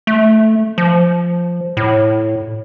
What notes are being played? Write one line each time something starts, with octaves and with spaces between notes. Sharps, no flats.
A3
F3
A2